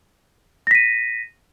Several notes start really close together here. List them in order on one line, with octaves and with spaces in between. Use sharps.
A#6 B6 D#7